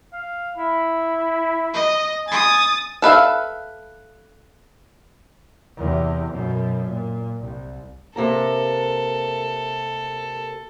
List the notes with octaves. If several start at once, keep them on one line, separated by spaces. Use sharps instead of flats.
F5
E4
D#5
G#5 D#6 A6
A4 B4 E5 F5
E2 C3
F#2 B2
A#2
C2
C3 A#3 A4 A#5